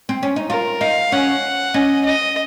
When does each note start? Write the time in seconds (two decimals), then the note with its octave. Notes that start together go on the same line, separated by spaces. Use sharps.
0.09 C4
0.23 C#4
0.36 D#4
0.50 F4 A#4
0.81 D#4 F5
1.12 C#4 F#5
1.74 C#4 D#5
2.05 D#5